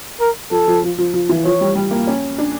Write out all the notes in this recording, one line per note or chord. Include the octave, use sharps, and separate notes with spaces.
A#4
F3 A4
F3
F3
F3
F3
E3
F3 C#5
G3
G3
A#3
C#4
D4